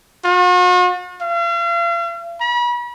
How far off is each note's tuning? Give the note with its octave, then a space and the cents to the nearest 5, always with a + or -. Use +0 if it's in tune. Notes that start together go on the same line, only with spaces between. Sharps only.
F#4 -45
F5 -40
B5 -40